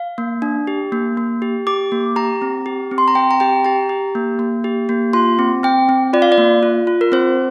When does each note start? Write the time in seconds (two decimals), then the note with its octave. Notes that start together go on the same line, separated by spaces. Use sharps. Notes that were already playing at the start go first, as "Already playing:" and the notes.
Already playing: F5
0.18 A#3
0.42 D4
0.67 G4
0.92 A#3
1.17 A#3
1.42 G4
1.67 G4 D6
1.92 A#3
2.16 G4 A#5
2.42 C4
2.66 G4
2.91 C4
2.98 C6
3.08 A#5
3.15 C4 G5
3.31 A#5
3.40 G4 G5
3.65 G4 A#5
3.89 G4
4.15 A#3
4.39 A#3
4.64 G4
4.89 A#3
5.13 F4 C6
5.39 C4
5.63 C4 G5
5.89 C4
6.13 F4 D5
6.22 F5
6.32 D5
6.38 A#3
6.63 F4
6.87 F4
7.01 A#4
7.12 C4 C5